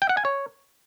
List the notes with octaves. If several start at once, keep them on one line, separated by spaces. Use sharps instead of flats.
G5
F#5
G#5
C#5